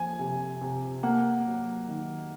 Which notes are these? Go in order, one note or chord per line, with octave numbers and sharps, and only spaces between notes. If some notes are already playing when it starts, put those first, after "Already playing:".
Already playing: F3 A#3 G#5
C3
C3
A#3 F#5
F#3
D#3